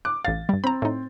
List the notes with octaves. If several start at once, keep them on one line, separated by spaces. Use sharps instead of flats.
D6 F#6
A1 F5 A6
G2 G3
C4 A#5 B5
A2 D#4